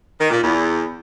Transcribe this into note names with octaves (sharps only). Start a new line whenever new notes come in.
D#3
A#2
E2